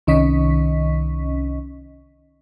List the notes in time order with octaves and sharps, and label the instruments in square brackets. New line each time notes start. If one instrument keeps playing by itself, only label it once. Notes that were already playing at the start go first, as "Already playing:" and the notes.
[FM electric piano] C2 D#3 C#4 D#5 C#6 B6